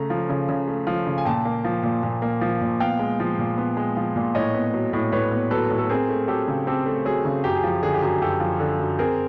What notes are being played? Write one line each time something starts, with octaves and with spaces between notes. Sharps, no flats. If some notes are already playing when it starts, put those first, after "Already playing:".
Already playing: C#3 A3 A#5
F3
C#3
C#3
A3
F3
C#3
G#5
A#2 G5 A5
A#3
F3
A#2
A#2
A#3
F3
A#2
B3 F5 G5
G#3
F3
A#2
B3
G#3
F3
A#2
A2 C#5 D#5
B3
F#3
A2
A2 B4 C#5
B3
F#3 A4 B4
A2
A4
C4 G#4 A#4
A3
F#3 G4 A4
C#3
C4 G4 A4
A3
F#3 G#4
C#3
F#2 G4
G#4
F3 G4
D3 G#4
G4
F#2 G#4
F#2 G4 A4
F3
D3
F#2
C4 G#4 A#4